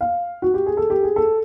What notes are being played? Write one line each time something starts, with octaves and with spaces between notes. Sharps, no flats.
F5
F#4
G4
G#4
A4
G4
G#4
A4